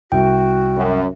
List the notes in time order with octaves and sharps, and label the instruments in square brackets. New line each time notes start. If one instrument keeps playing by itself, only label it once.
[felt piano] C2 [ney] F#4 [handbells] G5
[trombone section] F#2